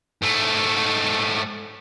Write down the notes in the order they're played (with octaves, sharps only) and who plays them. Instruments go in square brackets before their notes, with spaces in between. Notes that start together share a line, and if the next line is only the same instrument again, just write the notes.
[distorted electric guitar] G#2 A3